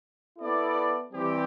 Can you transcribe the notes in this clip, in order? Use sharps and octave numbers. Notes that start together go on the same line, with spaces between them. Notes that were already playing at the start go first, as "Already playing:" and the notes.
B3 E4 A4 D5
E3 G3 C4 G4